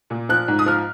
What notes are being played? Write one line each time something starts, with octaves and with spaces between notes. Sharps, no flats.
A#2
F3 F#6
G#2
D#6
F3 F6